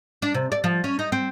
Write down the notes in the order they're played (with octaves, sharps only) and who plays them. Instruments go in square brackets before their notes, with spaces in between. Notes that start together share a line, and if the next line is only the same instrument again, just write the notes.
[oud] D4
C3
D5
F3
C#4
D#4
C4